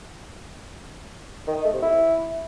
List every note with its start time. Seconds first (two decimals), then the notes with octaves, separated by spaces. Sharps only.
1.47 D#3
1.56 D#4
1.65 A3
1.73 C3
1.82 E4